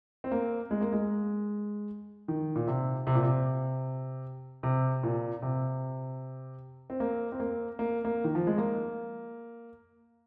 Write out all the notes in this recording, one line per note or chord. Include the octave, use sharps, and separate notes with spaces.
C4
A#3
G#3
A#3
G#3
D#3
A#2
C3
C3
A#2
C3
C3
A#2
C3
C4
A#3
C4
A#3
A#3
A#3
D#3
F3
G#3
A#3